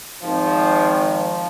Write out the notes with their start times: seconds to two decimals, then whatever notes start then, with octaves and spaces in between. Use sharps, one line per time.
0.23 G#1 G#2 D#3 F3
0.98 F3